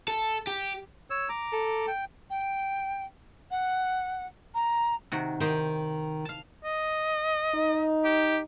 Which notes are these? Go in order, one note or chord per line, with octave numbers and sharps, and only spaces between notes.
A4
G4
C#5 E6
A#5 D6
A4
G5
G5
F#5
A#5
C3 D#3 F#4
D#3 D#4 G4 C5
F5 A5
D#5
D#4
G4